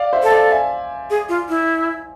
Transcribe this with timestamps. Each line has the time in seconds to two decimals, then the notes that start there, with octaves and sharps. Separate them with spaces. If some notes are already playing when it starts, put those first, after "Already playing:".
Already playing: D5 F5
0.13 C5 E5
0.23 A4
0.31 D5 F5
0.51 E5 G#5
1.10 G#4
1.29 F4
1.49 E4